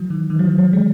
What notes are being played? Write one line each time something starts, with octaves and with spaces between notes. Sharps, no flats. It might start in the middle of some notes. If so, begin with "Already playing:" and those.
Already playing: E3 F#3
D#3
D#3
F#3
E3
F#3
G#3